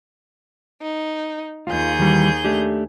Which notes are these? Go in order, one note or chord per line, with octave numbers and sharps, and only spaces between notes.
D#4
D#2 F4 G#4 G6
D#3 E3 G3
A3 D4 G4